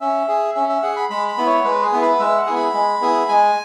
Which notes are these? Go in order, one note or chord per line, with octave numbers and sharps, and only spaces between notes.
C#4 E5
G#4
C#4 E5
E5
G#4 F#5
B5
G#3 B5
B5
B3 E4
C#5
G#3 B4
G#4
B3 E4
B4
G#3 E5
F#5
B3 E4 G#4
B5
G#3
B3 E4 G#4
G#3 G#5